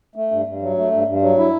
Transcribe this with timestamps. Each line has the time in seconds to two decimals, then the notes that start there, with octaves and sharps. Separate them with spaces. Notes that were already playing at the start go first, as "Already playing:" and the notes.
0.16 A3
0.31 G2
0.47 G2
0.62 F#3
0.77 A3
0.92 G2
1.07 G2
1.22 F#3
1.38 E4